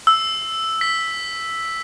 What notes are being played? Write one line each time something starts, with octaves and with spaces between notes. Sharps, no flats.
E6
B6